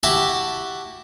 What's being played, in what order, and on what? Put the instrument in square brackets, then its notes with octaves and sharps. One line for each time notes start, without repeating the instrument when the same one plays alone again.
[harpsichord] E4 F#4 G4 F#5 A5